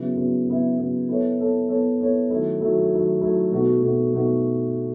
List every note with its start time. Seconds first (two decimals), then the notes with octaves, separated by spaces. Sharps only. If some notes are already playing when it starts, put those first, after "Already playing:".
Already playing: C#3 F#3 B3 E4
0.16 C#3 F#3 B3 E4
0.46 C#3 F#3 B3 E4
0.78 C#3 F#3 B3 E4
1.08 B3 E4 A4 C#5
1.38 B3 E4 A4 C#5
1.68 B3 E4 A4 C#5
2.00 B3 E4 A4 C#5
2.30 D#3 F#3 A3 E4
2.60 D#3 F#3 A3 E4
2.91 D#3 F#3 A3 E4
3.21 D#3 F#3 A3 E4
3.51 B2 A3 D#4 F#4
3.82 B2 A3 D#4 F#4
4.13 B2 A3 D#4 F#4